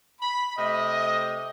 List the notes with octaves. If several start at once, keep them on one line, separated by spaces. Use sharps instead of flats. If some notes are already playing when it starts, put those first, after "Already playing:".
B5
C3 A3 D#5